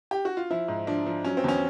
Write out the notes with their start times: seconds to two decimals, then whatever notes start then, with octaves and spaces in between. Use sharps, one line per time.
0.11 G4
0.25 F#4
0.37 F4
0.50 F3 E4
0.68 G#2
0.87 F3 D4
1.06 F3
1.24 F#3 C#4
1.37 C4
1.44 E2 C#4